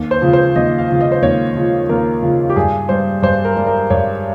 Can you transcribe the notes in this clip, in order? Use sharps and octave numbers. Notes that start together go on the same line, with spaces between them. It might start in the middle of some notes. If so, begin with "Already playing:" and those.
Already playing: D#2
C5
C#3 F3
C5
D#2 D#5
F5
C#3 F3
D#5
C5
D#2 C#5
C#3 F3
D#2 A#4
C#3 F3
G4
G2 G#4
G3 C5
G2 C5
A#4
G3
A#4
G2 C#5